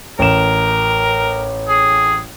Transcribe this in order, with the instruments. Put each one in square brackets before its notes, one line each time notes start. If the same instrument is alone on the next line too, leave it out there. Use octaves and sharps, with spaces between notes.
[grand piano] A1 E7 [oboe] A#4
[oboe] G#4